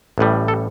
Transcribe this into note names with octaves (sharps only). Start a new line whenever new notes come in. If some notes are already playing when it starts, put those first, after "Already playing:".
A1 A2 G3
A4